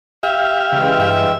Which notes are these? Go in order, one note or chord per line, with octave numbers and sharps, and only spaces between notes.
G4 E5 F5
C#3 E3 G#3 G5
G2 E5